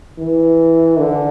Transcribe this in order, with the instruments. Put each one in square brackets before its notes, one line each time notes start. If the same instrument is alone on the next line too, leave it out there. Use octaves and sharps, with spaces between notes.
[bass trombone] E3
D3